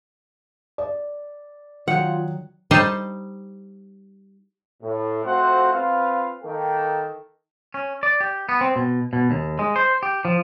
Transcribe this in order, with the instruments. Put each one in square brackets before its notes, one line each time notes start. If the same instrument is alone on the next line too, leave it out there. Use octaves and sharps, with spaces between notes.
[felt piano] D5
[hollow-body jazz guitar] D#3 F#3 [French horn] F4 [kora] F#5
[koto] G3 D#4 C5 D#5 A5
[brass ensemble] A2
A3 C4 F4 F#4 C5 F#5
C4 F4 B4 F5
D#3 A#3 A4 G5
[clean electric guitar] C#4
D5
G4
B3
C4
B2
B2
D#2
G#3
C5
G4
F3